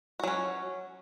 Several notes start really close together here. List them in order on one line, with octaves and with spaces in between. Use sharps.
F#4 F#3 C#4